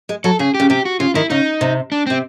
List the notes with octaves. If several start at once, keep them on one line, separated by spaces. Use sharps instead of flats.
G#3
F#3 A4
C#3 G#4
G4
C#3
C3 G4
F#4
C#3 F4
D#3 E4
C#3 D#4
C3
D4
C3 C4